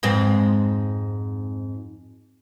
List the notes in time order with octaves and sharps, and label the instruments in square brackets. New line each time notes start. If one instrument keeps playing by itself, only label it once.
[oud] F2 G#2 C4